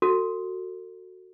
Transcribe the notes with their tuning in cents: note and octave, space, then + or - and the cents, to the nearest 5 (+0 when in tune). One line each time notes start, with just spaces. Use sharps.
F#4 +0 A4 +35